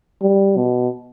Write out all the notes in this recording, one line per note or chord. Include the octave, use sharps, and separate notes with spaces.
G3
B2